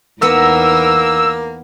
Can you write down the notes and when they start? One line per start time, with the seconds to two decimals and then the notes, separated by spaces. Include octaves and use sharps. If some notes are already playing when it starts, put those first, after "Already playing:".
0.22 E2 A#3 B3 D#4 A#4 E5 E6